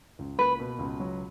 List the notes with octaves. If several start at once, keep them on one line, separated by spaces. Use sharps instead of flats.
C#2
A#3 B4
B2
C#2
F#3